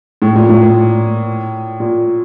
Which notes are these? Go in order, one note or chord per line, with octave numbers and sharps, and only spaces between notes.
A2
A#2
A2
A#2